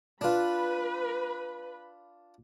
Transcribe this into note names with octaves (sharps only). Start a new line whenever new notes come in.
D4 F4 B4 B5